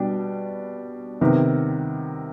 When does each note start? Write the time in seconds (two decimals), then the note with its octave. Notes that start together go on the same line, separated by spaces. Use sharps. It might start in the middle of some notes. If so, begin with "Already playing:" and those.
Already playing: B2 G3 D4 G4
1.21 C3 D#3 B3